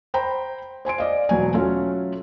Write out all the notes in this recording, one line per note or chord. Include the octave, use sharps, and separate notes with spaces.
C5 G5 A#5 B5
C5 G#5 C6 D7
D5 D#5 F5
E1 F#3 G#5
F#3 A3 C#4 F4 F#4 A4